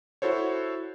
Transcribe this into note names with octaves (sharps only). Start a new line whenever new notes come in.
E4 F#4 A4 C5 C#5